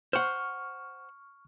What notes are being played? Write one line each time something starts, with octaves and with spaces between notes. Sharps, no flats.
C5 F#5 C#6 F6